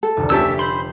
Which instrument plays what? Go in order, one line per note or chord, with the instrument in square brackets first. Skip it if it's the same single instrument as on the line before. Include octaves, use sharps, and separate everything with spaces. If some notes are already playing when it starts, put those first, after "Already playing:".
[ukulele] A4
[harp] F1 D2
[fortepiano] C#4 G4 A5 [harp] C#5 [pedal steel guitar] E5 E6
[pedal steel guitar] C5 B5 C6